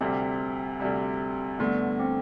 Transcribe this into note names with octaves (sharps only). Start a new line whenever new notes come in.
D2 C3 G3 C4
D2 C3 G3
G2 D3 A3 B3
C4